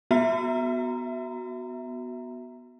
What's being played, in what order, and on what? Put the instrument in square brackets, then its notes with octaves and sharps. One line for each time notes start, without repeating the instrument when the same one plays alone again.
[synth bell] B3 F#4 E5 A#5